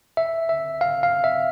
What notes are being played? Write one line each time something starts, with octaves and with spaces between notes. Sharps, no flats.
E5
E5
F5
F5
E5